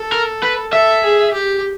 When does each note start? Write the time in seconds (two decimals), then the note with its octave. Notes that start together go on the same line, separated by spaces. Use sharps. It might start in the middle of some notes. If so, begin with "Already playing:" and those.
Already playing: A4
0.12 A#4
0.43 B4
0.73 A4 E5
1.04 G#4
1.33 G4